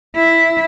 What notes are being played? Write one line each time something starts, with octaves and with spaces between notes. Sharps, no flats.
E4